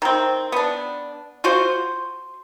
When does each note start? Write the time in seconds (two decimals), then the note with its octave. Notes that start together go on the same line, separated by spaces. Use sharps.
0.02 D#3 C4
0.52 B3 D4
1.44 F4 F#4 C5